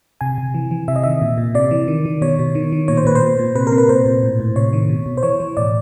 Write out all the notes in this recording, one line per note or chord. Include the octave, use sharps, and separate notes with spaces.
C3 G#5
C3
E3
E3
C3 E5
D#5
D#3 E5
A#2
A#2
C3 D5
E3
D#3
D#3
B2 C#5
B2
D#3
D#3
A#2 C#5
C5
A#2 B4
C5
A#2
A#2
C3 B4
A#4
C3
B4
A#2 C5
A#2
A2
A2
C3 C#5
D#3
B2
B2
C5
E3 C#5
E3
A2 D5